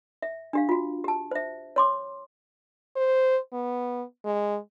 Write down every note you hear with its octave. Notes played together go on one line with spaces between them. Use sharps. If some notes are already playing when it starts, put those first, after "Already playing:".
E5
D4 G4 F5
F4 F#4
G4 A5
C5 E5
C#5 C6 D6
C5
B3
G#3